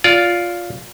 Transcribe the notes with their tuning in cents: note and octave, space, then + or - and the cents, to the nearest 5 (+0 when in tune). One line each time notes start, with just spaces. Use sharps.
F4 +5 D5 -25